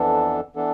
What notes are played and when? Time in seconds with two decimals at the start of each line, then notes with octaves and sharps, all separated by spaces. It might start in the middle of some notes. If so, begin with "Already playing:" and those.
Already playing: F2 E3 B3 D4 A4
0.56 E3 B3 D4 A4